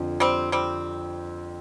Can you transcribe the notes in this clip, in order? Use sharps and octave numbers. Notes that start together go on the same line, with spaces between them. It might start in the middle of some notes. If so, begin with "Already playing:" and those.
Already playing: F2 D3 F3
G3 C4
G3 C4